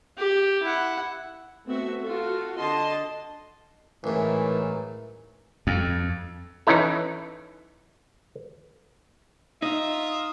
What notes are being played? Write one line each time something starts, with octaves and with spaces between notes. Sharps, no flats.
G4
E4 F#5
A3 B3 C4 F#4 E5
F4 F#4 A4
D3 D#5 A5 C6
A1 G#2 D#3 E3 F#3 A3 A#4
F2
E3 C#4 D#4 E4 A4
D#4 F4 D#5 E5